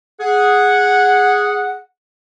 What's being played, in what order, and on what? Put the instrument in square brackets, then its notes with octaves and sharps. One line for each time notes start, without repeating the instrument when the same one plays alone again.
[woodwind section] G#4 F#5